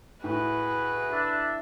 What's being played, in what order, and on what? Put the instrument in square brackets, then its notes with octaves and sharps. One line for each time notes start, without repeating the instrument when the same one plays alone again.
[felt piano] A2 [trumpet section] E4 F#4 G#4 [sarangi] B4
[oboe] D4 [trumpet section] E5